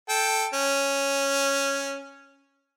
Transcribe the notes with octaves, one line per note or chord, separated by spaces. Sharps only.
A4 G5
C#4